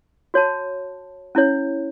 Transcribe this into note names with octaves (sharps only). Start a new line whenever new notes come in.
F#4 C#5 A5
C#4 E4 C#5